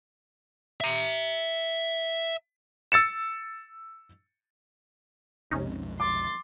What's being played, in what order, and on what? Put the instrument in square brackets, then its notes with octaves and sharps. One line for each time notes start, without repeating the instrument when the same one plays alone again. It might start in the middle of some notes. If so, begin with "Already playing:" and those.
[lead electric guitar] E5 A#5
[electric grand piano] E6 A6 C#7 E7
[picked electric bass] B1 F2 G#3 [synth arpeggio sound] C3 C#4 D#4
[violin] C6 A6 [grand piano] D6